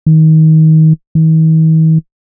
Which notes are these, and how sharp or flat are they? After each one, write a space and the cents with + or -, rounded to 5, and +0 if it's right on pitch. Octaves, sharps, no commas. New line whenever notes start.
D#3 +25
D#3 +45